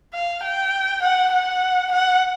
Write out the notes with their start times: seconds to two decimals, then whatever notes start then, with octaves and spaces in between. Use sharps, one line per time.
0.14 F5
0.43 G5
1.02 F#5
1.32 F#5
1.92 F#5